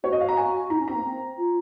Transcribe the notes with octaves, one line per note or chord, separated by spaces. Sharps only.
F#4 C#5
D#5
F5
A#5
G#5
D#4 A#5
C#4
C4 A#5
A#3
C4
F4